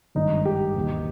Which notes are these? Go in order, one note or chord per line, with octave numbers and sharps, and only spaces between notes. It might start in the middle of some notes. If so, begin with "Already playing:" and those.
G#1 G2 D#3 D#4
G4
E1 D#2 D#3